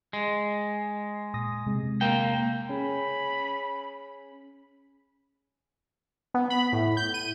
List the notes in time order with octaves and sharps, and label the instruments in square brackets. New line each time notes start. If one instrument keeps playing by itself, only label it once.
[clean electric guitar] G#3
[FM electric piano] A#2 D#6 A#6
C3 G#3
[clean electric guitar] A#3 G5
[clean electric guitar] C#4 G#4 [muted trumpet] B5
[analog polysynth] B3
B5
A2
G6
D#7